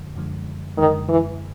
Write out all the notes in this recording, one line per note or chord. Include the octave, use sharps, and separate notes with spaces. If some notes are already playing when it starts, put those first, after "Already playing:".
Already playing: F#2 D3 F3 G#3
F#2 D3 F3 G#3
F#2 D3 D#3 F3 G#3
E3